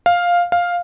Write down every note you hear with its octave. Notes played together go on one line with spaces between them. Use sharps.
F5
F5